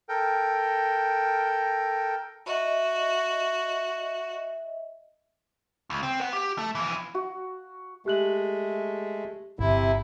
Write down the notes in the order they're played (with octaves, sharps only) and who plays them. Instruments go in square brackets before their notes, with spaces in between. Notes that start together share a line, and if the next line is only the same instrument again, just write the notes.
[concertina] A4 A#4 G5
[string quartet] F#4 [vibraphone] D#5 E5
[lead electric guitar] C#2
C4
B4 F#5
G4
A3
F2 E3
[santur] F#4
[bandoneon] G#3 A3 [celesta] G4 F#6 F#7
[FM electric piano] G1 [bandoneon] C3 E4